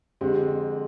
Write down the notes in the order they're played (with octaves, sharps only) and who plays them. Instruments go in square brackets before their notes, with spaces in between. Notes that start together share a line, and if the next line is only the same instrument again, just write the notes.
[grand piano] F2 D3 G#3 C4 [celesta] G4